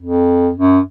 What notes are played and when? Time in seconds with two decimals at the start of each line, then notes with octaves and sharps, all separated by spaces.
0.02 F2
0.56 F#2